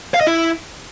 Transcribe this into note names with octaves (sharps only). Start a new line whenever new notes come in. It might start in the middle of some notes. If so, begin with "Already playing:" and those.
F5
D#5
E4